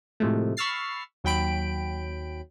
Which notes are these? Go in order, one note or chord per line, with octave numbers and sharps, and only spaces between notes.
A2 C3 F3 G#3 A3
B5 C#6 E6 F6 A6 C7
D#2 F#3 G5 B5 D7